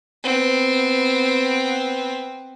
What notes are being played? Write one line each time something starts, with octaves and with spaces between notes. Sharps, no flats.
B3 C4